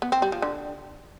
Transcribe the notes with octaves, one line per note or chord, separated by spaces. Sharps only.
B3
C4
G3
F3
D3